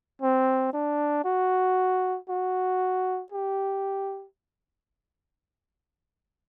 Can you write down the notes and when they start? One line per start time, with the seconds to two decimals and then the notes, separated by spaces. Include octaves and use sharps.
0.22 C4
0.73 D4
1.24 F#4
2.29 F#4
3.32 G4